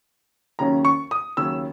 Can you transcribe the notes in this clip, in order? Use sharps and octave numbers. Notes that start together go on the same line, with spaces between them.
D#2 C#3 F#3 C#4 A#5
C#6
D#6
D#2 C#3 F#3 C#4 E6